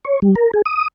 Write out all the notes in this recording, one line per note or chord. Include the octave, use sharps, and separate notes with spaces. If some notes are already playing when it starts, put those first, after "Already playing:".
C#5
G3
A#4
G#4
D#6